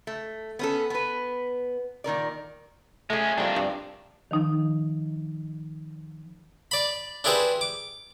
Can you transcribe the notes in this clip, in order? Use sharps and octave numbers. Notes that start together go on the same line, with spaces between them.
A3
B3 C#4 A4
B3 B4
A#2 D#3 A#4 D5
G#3 A3 C#4 G#4
D#3 G3 C4 D4 F4
G2
D#3 F3 D#4
D5 B5
D4 E4 G4 G#4 B4 C5
D6